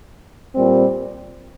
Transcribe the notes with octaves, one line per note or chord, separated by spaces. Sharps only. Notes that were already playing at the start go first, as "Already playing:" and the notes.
A#2 G3 C4